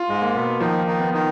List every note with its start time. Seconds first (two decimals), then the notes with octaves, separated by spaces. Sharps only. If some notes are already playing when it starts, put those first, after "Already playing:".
Already playing: F4
0.09 G#2 G#3
0.22 A#3
0.35 B2 B3
0.60 D#3 F3 D#4
0.87 D#3 D#4
1.00 B3
1.14 D#3 D#4